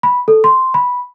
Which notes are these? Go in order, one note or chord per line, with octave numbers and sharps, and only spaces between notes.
B5
A4
C6
B5